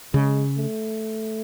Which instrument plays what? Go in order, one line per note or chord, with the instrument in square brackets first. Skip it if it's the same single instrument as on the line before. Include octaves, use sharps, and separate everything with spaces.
[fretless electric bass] C#3 [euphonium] G#3
[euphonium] A3